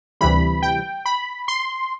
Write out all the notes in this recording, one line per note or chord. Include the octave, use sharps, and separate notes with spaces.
D2 C3 E3 G3 B5
G5
B5
C6